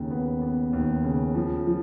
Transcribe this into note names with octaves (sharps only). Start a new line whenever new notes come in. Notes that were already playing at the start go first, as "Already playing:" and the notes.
Already playing: D#2 C#3
B3
B3
D#2
C#3
F3
F3